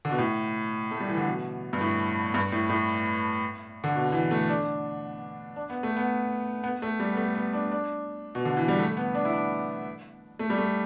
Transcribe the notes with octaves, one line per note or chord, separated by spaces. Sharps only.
D3
B2
A2
A3
G3
E3
D3
B2
G2
A2
G2
A2
A2
D3
B2
E3
A3
D4
D4
B3
A3
B3
B3
A3
G3
B3
A3
B3
D4
D4
B2
D3
E3
G3
A3
B3
D4
E4
D4
A3
G3
A3